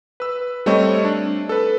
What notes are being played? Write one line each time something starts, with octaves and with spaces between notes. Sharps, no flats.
B4 E6
G3 A3 C4 C#5 D#5 C#6
D4
A4 B4